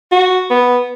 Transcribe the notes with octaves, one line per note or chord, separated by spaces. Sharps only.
F#4
B3